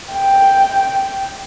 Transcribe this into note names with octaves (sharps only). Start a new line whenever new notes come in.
G5